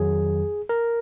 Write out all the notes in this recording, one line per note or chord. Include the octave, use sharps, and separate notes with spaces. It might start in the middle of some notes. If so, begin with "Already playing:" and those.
Already playing: F2 D#3 F#3 G#4
A#4